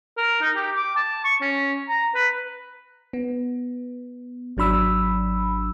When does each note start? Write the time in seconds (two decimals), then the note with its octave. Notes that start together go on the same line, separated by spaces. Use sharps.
0.17 A#4
0.41 D#4
0.56 G4
0.76 D6
0.96 A5
1.25 C#6
1.41 C#4
1.89 A#5
2.15 B4
3.13 B3
4.57 G#1 F#3 D4 B5 E6